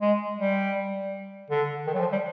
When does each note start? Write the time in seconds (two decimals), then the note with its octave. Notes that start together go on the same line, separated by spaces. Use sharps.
0.01 G#3
0.39 G3
1.50 D3
1.87 D#3
1.94 F#3
2.00 F3
2.12 G3